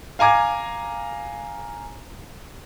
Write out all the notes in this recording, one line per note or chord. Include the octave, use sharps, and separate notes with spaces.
F5 G#5 A#5 D6 G#6